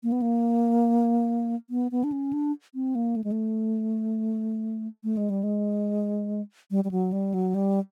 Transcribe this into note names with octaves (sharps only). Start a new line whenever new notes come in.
A#3
B3
A#3
B3
B3
D4
C#4
D4
C4
A#3
A3
G#3
A3
A3
G#3
G3
G#3
G3
G3
F#3
G3
F#3
G3